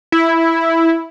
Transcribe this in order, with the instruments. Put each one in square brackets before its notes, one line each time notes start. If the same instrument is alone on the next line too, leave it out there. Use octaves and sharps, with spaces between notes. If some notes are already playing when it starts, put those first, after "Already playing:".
[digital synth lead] E4